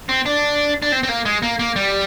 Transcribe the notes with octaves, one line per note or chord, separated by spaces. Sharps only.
C4
D4
D4
C4
C4
A#3
G#3
A#3
A#3
G3